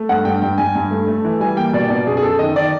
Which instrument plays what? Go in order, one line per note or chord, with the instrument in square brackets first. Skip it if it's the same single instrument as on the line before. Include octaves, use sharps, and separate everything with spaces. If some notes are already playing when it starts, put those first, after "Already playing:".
Already playing: [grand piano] A3
G2 F#5
G2 G5
G2 G5
G2 G#5
G2
A3
A3
E3
G3 G#5
A#3 G5
B2 D5
B2 D5
F#2 G#4
G#4
F#2 A4
D#3 D#5
D#3 D5